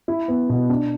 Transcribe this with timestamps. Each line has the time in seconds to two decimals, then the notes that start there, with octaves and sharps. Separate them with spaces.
0.08 E4
0.28 B3
0.49 B2
0.70 D4